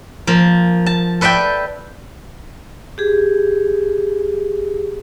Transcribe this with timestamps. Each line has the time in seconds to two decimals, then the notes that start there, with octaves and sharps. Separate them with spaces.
0.27 F3 A#3
0.86 A5
1.21 A4 B4 D5 E5 G5
2.98 G4 G#4